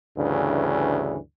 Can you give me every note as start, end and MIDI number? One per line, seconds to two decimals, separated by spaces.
0.17 1.17 38
0.17 1.17 43
0.17 1.17 49
0.17 1.17 52